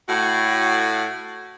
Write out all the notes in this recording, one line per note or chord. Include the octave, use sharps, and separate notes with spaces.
A2 F#4